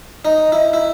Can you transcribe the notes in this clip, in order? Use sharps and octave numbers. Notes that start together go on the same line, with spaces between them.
D#4
E4
E4